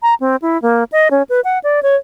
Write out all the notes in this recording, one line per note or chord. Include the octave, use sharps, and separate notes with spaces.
A#5
C4
E4
A#3
D#5
C#4
B4
F#5
D5
C#5